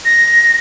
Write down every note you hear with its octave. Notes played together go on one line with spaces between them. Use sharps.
A#6